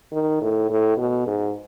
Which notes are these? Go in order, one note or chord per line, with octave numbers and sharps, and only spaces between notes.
D#3
A2
A2
B2
G#2